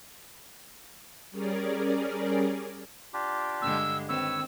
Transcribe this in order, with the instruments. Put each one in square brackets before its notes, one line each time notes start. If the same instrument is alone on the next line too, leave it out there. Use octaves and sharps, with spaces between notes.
[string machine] G3 C#4 G#4 A#4 D5
[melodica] D4 F4 G4
[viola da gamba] G2 D3 G#3 [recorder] E6
[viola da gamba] D#3 C4 [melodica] B4 C#5 [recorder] E6